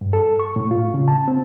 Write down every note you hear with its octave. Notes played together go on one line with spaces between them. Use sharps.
G2
A4
C#6
A2
F4
C#3
A5
C4